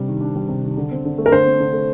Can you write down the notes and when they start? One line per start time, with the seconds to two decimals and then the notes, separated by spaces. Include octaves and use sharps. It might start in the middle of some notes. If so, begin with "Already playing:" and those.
Already playing: C3 G3 D4
0.08 D#3
0.21 D4
0.35 G3
0.49 C3
0.63 D#3
0.77 D3
0.91 C4
1.05 D3
1.18 A3
1.26 A#4
1.32 D3 C5
1.46 C4
1.60 D3
1.73 A3